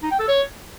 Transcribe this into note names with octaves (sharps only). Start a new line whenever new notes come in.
D#4
G5
A4
C#5